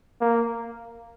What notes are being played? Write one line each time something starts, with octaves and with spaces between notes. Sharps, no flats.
A#3